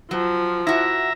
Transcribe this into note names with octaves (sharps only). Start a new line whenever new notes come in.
F3 F#3
E4 F#4 E5 A#5